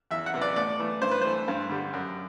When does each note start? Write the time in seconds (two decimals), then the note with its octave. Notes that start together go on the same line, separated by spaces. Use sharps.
0.11 E2 E5
0.26 F#5
0.34 C3 E3
0.41 D5
0.56 A2 D5
0.79 E3 A3
1.02 G2 C5
1.11 B4
1.21 E3 A3 C5
1.48 G2
1.70 D3 G3
1.93 F#2